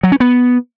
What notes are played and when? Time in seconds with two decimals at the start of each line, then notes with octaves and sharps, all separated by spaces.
0.03 F#3
0.12 C#4
0.20 B3